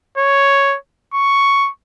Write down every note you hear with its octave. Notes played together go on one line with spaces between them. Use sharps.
C#5
C#6